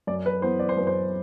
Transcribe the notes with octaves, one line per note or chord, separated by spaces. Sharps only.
F#2 D5
B4
E3 B3 C5
D5
C5
F#2 B4
C5